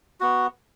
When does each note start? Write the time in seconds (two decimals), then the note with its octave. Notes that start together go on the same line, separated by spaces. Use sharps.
0.20 B3 F#4